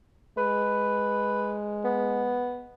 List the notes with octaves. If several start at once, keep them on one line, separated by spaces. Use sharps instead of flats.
G#3 B4
B3